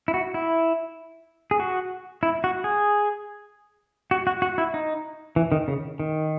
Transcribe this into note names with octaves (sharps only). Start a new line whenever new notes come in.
E4
F#4
E4
G#4
F#4
E4
F#4
G#4
F#4
F#4
F#4
E4
D#4
E3
D#3
C#3
D#3